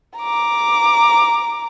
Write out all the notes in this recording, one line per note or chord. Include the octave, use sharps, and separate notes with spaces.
A#5 D6